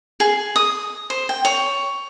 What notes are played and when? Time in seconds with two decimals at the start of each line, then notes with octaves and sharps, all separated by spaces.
0.20 G#4
0.56 D#6
1.10 C5
1.29 G5
1.45 C#5